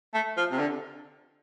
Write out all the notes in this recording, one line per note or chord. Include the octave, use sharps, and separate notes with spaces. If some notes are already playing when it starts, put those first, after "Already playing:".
A3
F3
C3
D3